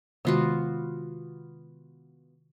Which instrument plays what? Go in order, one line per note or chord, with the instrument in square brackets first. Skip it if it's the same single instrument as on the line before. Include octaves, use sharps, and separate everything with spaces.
[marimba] C3 D#3 G#3 [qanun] B3 F4 F#4